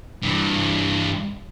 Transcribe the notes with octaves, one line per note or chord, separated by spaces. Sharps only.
G2 E3